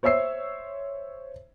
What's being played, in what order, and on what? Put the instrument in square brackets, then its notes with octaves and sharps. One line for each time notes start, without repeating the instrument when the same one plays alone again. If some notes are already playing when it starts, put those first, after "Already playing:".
[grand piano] C5 C#5 E5 E6 C7